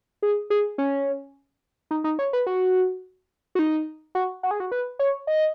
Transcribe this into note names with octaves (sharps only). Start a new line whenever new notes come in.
G#4
G#4
C#4
D#4
D#4
C#5
B4
F#4
F#4
D#4
F#4
F#4
G#4
F#4
B4
C#5
D#5